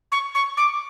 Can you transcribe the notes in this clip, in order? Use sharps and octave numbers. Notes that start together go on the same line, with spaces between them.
C#6
C#6
D6